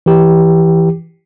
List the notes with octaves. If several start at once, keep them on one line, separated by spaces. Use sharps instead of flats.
E3 G4